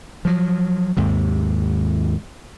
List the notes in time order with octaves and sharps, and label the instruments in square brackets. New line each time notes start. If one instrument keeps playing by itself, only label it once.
[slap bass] F3 F#3
D#2 G#2 C3